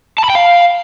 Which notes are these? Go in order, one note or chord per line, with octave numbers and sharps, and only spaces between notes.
A5
B5
G5
F5